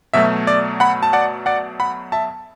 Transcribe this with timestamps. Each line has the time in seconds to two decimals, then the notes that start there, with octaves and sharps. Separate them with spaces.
0.13 B2 F#3 A3 E5
0.47 D5
0.80 F#5 B5
1.03 A5
1.13 D5 F#5
1.46 D5 F#5
1.80 F#5 B5
2.12 E5 A5